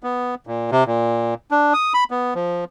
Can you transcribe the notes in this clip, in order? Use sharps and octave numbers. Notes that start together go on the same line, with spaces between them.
B3
A#2
C3
A#2
D4
D#6
B5
B3
F3